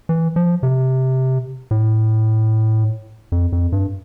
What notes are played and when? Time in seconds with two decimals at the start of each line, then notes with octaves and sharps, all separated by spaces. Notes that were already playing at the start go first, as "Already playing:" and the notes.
0.09 E3
0.36 F3
0.63 C3
1.71 A2
3.32 F2
3.52 F2
3.72 G2